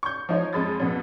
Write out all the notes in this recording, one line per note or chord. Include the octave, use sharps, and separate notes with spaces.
C#6 G6
F3 D#4 C#5
F2 G#3 B5 D#6 A6
F2 B2